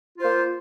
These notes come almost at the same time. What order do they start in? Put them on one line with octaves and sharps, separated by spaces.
F4 C5 A#3